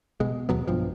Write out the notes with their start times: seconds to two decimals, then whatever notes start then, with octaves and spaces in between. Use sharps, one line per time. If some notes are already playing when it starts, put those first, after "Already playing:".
0.20 B2 G#3
0.49 D#2 B2 F#3 B3
0.67 B1 G2 F3